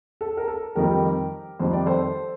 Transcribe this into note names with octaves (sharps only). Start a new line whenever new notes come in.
A4
A#4
A4
F2 D#3 G3 G4 A#4
F2 D#3 G3 C5
D5
A4 C5